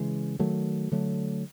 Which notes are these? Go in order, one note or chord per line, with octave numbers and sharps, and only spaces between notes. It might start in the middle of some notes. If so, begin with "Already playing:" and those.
Already playing: C#3 E3 G#3
D#3 F#3 A3
D3 F#3 A3